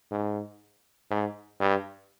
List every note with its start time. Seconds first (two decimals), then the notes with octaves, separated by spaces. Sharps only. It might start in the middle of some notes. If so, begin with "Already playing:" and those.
0.11 G#2
1.10 G#2
1.60 G2